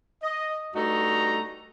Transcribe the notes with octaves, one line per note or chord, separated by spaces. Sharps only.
D#5
G2 A3 D#4 F#4 D#5 A#5